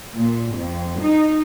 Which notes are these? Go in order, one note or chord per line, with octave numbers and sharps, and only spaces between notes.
A#2
F2
D#4